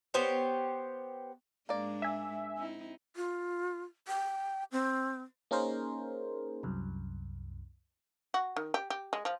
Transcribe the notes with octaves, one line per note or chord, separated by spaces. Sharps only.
B3 G4 C5 C#5
G#2 G#3 A#3 D4 D5
E5 G#5
C4 D#4 E4
F4
G5
C4
A#3 C#4 D#4 G#4 A#4 C5
C2 F#2
F#4
D#3
G4
G4
G#3
F3